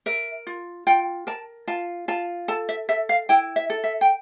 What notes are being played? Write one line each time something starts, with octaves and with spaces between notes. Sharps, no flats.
A#4 E5
F4
F4 G5
A#4 A5
F4 A5
F4 A5
A4 A5
E5
A4 E5
F5
E4 G5
E5
A4
E5
G5